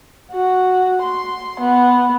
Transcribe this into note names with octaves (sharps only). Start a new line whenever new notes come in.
F#4
C6
B3